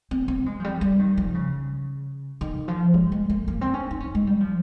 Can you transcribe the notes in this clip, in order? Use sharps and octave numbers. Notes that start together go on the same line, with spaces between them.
C4
C4
G#3
F3
G3
G3
D#3
F3
C#3
D#3
F3
G#3
G#3
A#3
A#3
C4
C#4
D#4
C#4
G#3
G3
F3